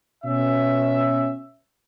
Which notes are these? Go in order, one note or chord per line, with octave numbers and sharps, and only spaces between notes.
B2 C#4 E5